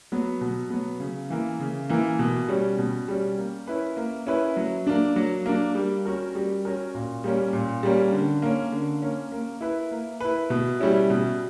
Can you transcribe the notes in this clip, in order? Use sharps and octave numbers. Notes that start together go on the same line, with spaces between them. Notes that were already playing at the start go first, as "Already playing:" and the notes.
F#3 B3
B2
F#3 B3
C#3
E3 A#3
C#3
E3 A#3
B2
G3 C#4
B2
G3 C#4
A#3
C#4 E4 B4
A#3
C#4 E4 B4
F#3
A#3 D4
F#3
A#3 D4
G3
C#4 F#4 A#4
G3
C#4 F#4 A#4
A#2
G3 A#3 C#4
A#2
G3 A#3 C#4
D3
A#3 C#4
D3
A#3 C#4
A#3
E4 B4
A#3
E4 B4
B2
G3 C#4 E4
B2